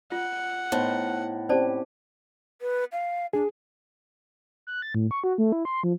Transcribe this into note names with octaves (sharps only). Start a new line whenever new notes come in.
F4 F#5
A2 B3 D#4 C5
C4 C#4 G4 C5 D5 A5
B4
F5
D4 G#4
F#6
A6
A2
C#6
F#4
A3
E4
C6
F3